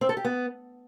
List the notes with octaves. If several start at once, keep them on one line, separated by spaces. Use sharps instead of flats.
C4
A4
G4
B3